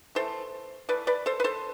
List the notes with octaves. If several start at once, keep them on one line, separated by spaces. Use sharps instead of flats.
E3 A3 A4 C5
E3 A3 B4 D5
B4 D5
A4 C5
B4
A4 C5